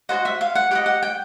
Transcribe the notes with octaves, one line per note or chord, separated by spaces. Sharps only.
F#4 A4 C5 D#5 F#5
E5
F5
F#5
G4 B4 D#5 F#5
F#5
G5